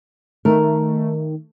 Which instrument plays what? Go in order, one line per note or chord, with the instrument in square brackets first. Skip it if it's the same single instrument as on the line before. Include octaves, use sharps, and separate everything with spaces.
[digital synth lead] D#3 [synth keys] A3 [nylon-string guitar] A#4